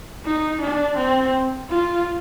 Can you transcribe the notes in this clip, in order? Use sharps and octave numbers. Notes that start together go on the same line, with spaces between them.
D#4
D4
C4
F4